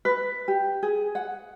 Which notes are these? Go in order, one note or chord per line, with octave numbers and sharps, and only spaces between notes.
B4
G4
G#4
F#5